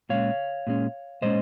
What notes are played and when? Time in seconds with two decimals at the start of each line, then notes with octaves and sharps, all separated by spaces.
0.09 A#2 G#3 C#4 C#5 F5
0.67 A#2 G#3 C#4
1.22 A#2 G#3 C#4 C5 D#5